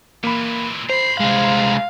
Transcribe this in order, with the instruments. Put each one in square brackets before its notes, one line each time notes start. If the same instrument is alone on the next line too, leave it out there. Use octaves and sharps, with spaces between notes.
[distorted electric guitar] A#2 E3 [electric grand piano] A#3 B5
[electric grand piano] C5 [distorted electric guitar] A#5 B5 [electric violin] C7
[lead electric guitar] C2 G#3 [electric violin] F5